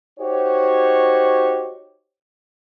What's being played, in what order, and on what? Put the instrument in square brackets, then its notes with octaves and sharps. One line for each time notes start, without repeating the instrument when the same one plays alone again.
[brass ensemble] D#4 F#4 G4 C5 C#5